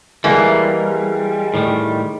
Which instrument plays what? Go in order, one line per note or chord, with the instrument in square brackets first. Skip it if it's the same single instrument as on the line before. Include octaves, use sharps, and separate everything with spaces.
[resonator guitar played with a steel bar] E3 A#3 [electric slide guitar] G3 [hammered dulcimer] G#3 A#4
[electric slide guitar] A2 D#3 G3